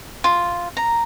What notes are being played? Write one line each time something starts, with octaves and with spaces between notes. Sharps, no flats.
F4
A#5